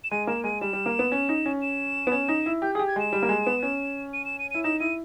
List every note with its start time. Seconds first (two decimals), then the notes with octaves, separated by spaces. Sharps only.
0.04 E7
0.11 G#3 D#7
0.27 A#3 E7
0.44 G#3 D#7
0.61 G3 E7
0.73 G3
0.86 A#3
0.99 B3
1.12 C#4
1.29 D#4
1.46 C#4
1.62 E7
2.07 B3
2.12 C#4
2.28 D#4
2.46 E4
2.62 G4 G6
2.74 G#4 D#6
2.79 G4
2.87 G#6
2.96 G#3 E7
3.13 G3
3.22 A#3
3.29 G#3
3.47 B3
3.62 C#4
4.13 D#7
4.25 E7
4.39 D#7
4.51 E4 D#7
4.64 D#4 E7
4.80 E4 D#7